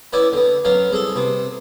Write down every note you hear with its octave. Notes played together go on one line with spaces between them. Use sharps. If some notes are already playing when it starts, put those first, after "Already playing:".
B3 C#4 E4 B4 D5 G#5
D3 B3
F#3 B3 C#4 F5
C2 G#4 A4
C3 B3